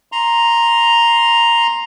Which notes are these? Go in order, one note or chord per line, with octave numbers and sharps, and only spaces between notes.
A#5 C6